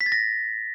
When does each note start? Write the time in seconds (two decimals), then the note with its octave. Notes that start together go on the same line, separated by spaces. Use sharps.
0.01 B6
0.06 A6
0.12 A#6